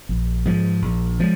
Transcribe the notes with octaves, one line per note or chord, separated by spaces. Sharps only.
A#1
G#2 F3 G#3
A#1
F3 G#3